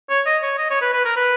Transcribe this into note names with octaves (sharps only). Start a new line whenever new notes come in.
C#5
D#5
C#5
D#5
C#5
B4
B4
A#4
B4